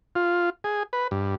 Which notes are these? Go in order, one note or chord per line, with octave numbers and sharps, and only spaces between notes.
F4
G#4
B4
G2